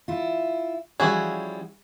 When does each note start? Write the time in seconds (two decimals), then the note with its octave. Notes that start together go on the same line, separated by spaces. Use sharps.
0.08 E4 F4
1.00 F3 G3 C#4 E4 F#4 G#4